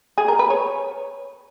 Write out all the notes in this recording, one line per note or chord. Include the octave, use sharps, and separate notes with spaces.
G#4
A#4
B4
C#5